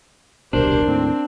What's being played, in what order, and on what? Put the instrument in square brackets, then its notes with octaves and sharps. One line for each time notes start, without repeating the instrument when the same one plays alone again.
[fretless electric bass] D#1 C2 B2 [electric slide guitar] D4 [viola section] G4 A#4 C5
[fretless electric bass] D#2 A2 [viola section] C4